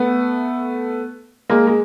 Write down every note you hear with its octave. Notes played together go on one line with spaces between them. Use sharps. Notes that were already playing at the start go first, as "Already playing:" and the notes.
Already playing: A3 B3
G#3 A#3
G#3